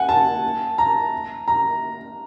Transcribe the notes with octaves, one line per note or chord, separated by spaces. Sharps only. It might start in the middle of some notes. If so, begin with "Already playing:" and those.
Already playing: F#5 G#5
A5
A#5
A#5